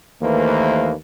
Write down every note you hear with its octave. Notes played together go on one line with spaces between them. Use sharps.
D#2 E3 A3 A#3 B4 C5